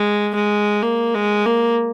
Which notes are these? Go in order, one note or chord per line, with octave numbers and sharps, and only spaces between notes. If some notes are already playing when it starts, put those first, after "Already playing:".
Already playing: G#3
G#3
A#3
G#3
A#3